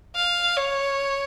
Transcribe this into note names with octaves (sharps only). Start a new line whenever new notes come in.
F5
C#5